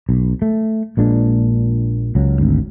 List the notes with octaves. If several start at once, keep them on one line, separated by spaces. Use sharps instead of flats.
B1
A3
A#1 A#2 G#3 D4
C#2 F#3
G#1 D2